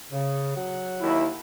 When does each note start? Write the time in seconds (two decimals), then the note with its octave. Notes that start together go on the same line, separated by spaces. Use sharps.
0.12 C#3
0.56 F#3 F#5
1.01 D#2 E4